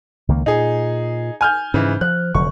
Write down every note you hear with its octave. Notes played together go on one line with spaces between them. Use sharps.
C#2 D#3 A#3
A#2 D#4 G#4
G#5 F6 G6
G#2 C#3 E3
F3 F#6
F1 D3 F#3 C#6